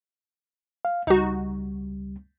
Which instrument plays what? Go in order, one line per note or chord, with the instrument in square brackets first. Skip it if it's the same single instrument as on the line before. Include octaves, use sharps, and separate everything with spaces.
[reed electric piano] F5
[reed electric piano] C#2 G3 [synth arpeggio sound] D#4 F#4